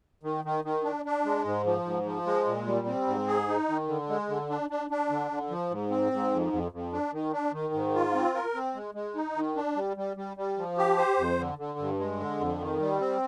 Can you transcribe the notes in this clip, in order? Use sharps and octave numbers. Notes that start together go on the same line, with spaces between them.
D#3
D#3
D#3
D4
D4
G#3
G#2
F3
G#2
F3
G#3
A#2
G3
C4
G#2
G#4
D#4
D#3
D3
G#3
D3
D4
D4
D4
D3
D3
F3
G#2
C4
G#2
F2
F2
F2
D4
D#3
D4
D#3
G#2
F4
C4
A#4
C4
G#3
G#3
D#4
D#3
D4
G3
G3
G3
G3
F3
G4
C5
F2
D3
D3
G2
G#3
D3
F2
D#3
G3
C4